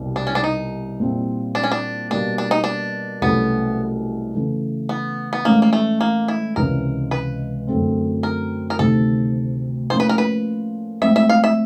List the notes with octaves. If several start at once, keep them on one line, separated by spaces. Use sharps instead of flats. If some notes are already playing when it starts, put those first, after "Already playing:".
Already playing: C2 B2 G3
D4
C#4
D4
D#4
A#2 G3 C4 E4
D4
C#4
D4
B2 G3 A#3 D4
D4
D#4
D4
C2 B2 F#3 A3 B3 C#4
C#3 E3 A3
B3
B3
A2 E3 G#3 A#3 C#4
A#3
A3
A#3
E4
C#2 C3 E3 G#3 C#4 A#4
B4
F#2 D3 F#3 A3 C4
A#4
A#4
D2 C3 D#3 A4
A2 F3 A#3 C#4 C5
B4
A#4
B4
A2 F3 G#3 C4 E5
E5
F5
E5